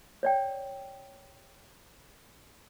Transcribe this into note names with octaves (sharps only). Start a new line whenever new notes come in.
C#5 D5 G5